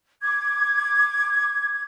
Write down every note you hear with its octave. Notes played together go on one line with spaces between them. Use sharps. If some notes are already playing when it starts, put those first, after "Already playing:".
D6 G#6